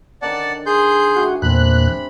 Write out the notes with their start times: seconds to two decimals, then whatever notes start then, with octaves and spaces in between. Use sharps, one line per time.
0.22 D3 D#3 C#4 D5 F#5 A5
0.66 G#4 C6 G6
1.16 A3 F#4 G4 G#5
1.42 E2 A#2 C4 D4 B5 F#6